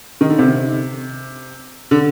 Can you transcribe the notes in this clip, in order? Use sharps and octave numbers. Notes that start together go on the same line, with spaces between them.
D#3
D3
C3
D3